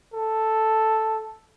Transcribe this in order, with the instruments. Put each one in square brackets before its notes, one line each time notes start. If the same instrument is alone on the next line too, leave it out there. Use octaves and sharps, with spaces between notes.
[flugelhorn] A4